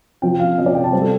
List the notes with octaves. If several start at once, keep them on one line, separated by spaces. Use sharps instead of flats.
C3 F3 G5
F5
C3 F3 D#5
D5
G5
A5
C3 G3 C5
A4